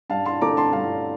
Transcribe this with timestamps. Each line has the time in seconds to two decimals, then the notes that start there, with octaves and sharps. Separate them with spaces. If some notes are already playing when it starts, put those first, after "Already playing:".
0.10 G2 F5 A5
0.26 A5 C6
0.41 D3 A3 C4 A#5 D6
0.57 A5 C6
0.73 G2 F5 A5